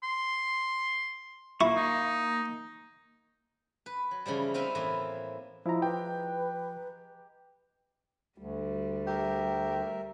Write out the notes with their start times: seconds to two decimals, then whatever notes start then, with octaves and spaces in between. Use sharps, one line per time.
0.03 C6
1.61 A#3 E4 C#6
1.76 D#4
3.86 B4
4.11 F#3
4.26 C#3 E3 F3 G3
4.54 B3 C4 D#4 A#4 D#5 E5
4.75 A2 E3 A#3 D#5
5.66 F3 G#3 E4 A#5
5.82 G4 B4 G5
8.38 D2 G3
9.07 G4 A#4 E5